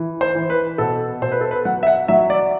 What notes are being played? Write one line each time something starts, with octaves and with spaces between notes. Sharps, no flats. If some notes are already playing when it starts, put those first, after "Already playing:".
Already playing: E3
C5
E3
B4
B2 A4
B2 C5
B4
A4
B4
F#3 F#5
E5
F#5
F#3 E5
D5